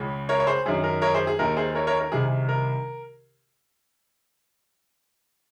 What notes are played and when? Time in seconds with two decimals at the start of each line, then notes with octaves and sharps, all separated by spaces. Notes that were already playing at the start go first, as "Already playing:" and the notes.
Already playing: C#2 C#3
0.29 A#4 C#5
0.40 C#5
0.47 G#4 C5
0.66 F#2 D#3 G#4
0.84 A#4
1.02 A#4 C#5
1.14 G#4 C5
1.27 G#4
1.39 D#2 D#3 A#4
1.56 G#4 C5
1.75 A#4 C#5
1.87 A#4 C#5
2.00 A#4
2.12 C2 C3 D#3 G#4
2.49 A#4